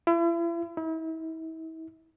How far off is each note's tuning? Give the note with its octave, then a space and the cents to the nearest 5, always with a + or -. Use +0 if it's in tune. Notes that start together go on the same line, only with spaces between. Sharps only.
E4 +40
E4 -40